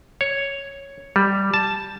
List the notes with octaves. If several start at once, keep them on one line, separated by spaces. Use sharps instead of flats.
C#5
G3
A5